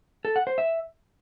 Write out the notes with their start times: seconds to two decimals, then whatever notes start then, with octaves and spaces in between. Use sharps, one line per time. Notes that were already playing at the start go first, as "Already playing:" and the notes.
0.25 A4
0.36 F#5
0.47 C5
0.58 E5